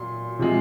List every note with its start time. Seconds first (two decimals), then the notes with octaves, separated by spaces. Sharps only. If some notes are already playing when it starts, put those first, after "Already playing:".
Already playing: A#2 F#3 C6
0.39 C3 F3 G#3